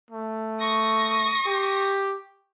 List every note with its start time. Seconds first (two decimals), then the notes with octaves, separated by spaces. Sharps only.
0.11 A3
0.60 C#6 D#6 A#6
1.46 G4